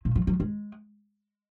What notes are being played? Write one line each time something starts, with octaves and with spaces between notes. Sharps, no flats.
A#2
F3
F#3
G#3